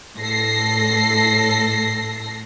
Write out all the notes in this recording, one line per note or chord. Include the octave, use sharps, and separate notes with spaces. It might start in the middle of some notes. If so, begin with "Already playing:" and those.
A2 A4 A#6 C7